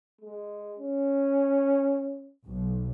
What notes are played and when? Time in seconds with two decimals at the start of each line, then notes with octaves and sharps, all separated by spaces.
0.21 G#3
0.79 C#4
2.46 B1